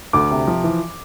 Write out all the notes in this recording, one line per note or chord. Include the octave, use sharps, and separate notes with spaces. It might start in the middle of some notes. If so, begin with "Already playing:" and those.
D2 D6
C3
F3
E3